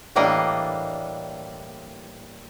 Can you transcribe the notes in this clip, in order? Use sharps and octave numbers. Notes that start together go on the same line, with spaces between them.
A2 E3 G3 A#3 D4 D#5